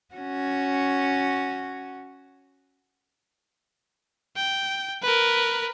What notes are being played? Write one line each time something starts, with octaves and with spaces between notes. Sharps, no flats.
C#4 F#4
G5
A#4 B4